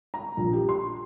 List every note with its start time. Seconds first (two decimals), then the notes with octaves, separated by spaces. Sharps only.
0.14 A#5
0.37 A#1
0.53 G4
0.69 C6